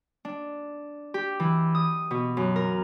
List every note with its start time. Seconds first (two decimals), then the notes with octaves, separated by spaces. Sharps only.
0.25 D4
1.14 G4
1.40 E3
1.75 D#6
2.11 B2
2.37 F#2
2.56 A#4